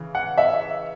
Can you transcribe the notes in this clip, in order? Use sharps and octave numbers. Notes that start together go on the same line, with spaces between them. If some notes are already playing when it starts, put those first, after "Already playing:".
Already playing: C#3 E3
F#5
E5